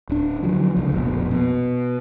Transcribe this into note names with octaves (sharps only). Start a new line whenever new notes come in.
D1 D4
D3 F3 F#3
C#2 D3
F1 A#1 B2
B2